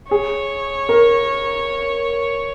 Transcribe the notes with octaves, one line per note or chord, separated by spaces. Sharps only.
G#4 C#5
A#4